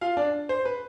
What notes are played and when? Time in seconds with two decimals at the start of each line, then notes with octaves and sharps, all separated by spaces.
0.01 F4 F5
0.17 D4 D5
0.49 C5
0.65 B4